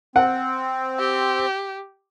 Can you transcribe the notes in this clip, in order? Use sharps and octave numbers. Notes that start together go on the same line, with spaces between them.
C4 F#5
G4